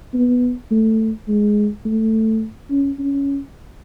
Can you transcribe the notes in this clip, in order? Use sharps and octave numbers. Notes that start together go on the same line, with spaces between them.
B3
A3
G#3
A3
C#4
C#4